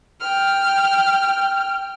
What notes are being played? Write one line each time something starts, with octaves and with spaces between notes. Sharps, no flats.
G5 F6